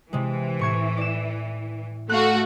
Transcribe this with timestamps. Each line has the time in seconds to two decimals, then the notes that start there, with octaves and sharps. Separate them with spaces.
0.13 C3 E3 G#3
0.59 A2 C#6 G#6
0.97 D5 E7
2.09 A3 F#4 F5 F#6